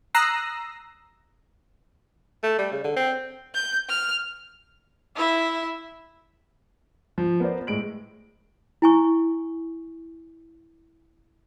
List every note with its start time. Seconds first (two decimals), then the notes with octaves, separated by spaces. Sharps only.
0.14 A#5 D#6 E6 F#6 A#6 C7
2.43 A3
2.59 G3
2.71 C#3
2.84 D3
2.96 C4
3.55 G6
3.89 F6
5.15 E4 E5
7.18 F3
7.40 B3 A#4 C5 D5
7.67 A2 G#3 D7 F#7
8.82 E4 G#5 C#6